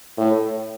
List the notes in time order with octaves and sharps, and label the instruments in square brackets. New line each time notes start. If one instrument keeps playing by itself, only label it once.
[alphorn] A2